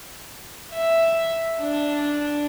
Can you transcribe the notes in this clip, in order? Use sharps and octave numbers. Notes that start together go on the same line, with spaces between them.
E5
D4